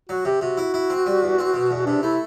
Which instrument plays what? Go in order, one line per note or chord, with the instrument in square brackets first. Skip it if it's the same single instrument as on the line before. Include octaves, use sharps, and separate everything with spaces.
[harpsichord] F#3 [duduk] F#4
[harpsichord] C3 [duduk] G4
[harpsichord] C3 [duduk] F#4
[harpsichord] E4
E4
C4
G3
E2
C4
B2
E2
[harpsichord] C3 [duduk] D4
[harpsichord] A3 [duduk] E4